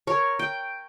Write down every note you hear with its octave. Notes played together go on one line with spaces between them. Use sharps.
A#4 C#5
G5